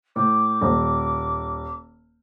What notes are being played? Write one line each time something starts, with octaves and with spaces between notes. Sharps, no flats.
A2 D6
D#1